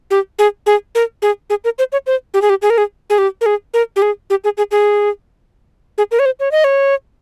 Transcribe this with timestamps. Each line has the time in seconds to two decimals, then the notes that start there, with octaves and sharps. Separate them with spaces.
0.11 G4
0.39 G#4
0.66 G#4
0.95 A#4
1.22 G#4
1.50 G#4
1.64 A#4
1.79 C5
1.92 C#5
2.07 C5
2.34 G4
2.42 G#4
2.50 G4
2.62 G#4
2.70 A#4
2.78 G#4
3.10 G#4
3.18 G4
3.41 A#4
3.46 G#4
3.74 A#4
3.96 G4
4.02 G#4
4.30 G4
4.44 G#4
4.58 G#4
4.71 G#4
5.98 G#4
6.11 A#4
6.19 C#5
6.26 C5
6.40 C#5
6.52 D#5
6.64 C#5